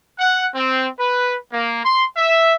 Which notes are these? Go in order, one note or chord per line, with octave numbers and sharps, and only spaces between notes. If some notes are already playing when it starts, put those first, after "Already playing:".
F#5
C4
B4
A#3
C6
E5